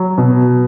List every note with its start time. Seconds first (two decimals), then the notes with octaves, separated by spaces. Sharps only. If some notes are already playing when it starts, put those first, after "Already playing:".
Already playing: F#3
0.18 B2